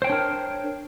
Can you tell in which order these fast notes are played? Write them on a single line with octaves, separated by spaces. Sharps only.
C5 G5 C#5 D4 A#4